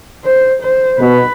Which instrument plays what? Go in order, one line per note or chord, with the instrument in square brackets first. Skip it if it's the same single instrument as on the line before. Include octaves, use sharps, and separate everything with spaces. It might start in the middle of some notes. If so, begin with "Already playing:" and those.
[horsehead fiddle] C5
C5
[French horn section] B2 [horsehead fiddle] B4